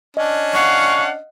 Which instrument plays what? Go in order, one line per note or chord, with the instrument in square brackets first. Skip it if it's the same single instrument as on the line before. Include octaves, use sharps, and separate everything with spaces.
[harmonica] C#4 D4 [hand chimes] D#5
[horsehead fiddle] F5 F#5 [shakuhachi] C#6